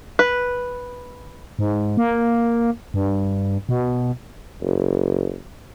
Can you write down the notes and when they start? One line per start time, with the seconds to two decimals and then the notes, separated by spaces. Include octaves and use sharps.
0.19 B4
1.59 G#2
1.97 A#3
2.94 G2
3.69 B2
4.62 F#1